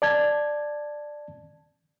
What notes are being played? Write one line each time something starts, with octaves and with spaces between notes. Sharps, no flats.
D5 A5 G#6